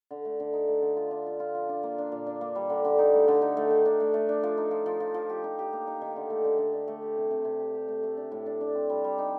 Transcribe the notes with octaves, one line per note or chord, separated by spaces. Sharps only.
D3
A3
D3
D#4
A3
D3
F4
D4
F4
F4
F3
D4
A#3
D4
A#2
D4
A#3
G3
D3
D3
D#4
A3
D3
D#4
A3
D#3
D4
A3
A3
D4
F3
D#4
F3
F3
F3
F3
G4
D#4
G4
A#3
D#4
D#3
D3
A3
D3
D3
D4
A3
G4
C3
C3
C3
G4
G4
A3
A3
D4
A2
D4
D4
C4
G3
G3
D#4